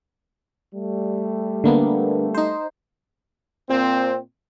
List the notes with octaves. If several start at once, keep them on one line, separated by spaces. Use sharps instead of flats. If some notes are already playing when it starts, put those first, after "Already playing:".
G3 A3
D3 A#3 B3
D#4 C5
A#2 C4